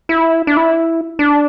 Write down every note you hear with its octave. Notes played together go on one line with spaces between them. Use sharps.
E4
D4
E4
D4